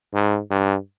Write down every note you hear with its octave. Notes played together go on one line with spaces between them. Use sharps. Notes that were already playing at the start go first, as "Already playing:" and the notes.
G#2
G2